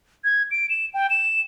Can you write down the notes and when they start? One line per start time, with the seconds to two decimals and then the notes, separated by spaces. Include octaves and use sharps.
0.24 G#6
0.51 D7
0.70 E7
0.94 G5
1.10 E7